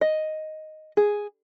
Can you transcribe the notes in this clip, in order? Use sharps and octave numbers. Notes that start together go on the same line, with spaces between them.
D#5
G#4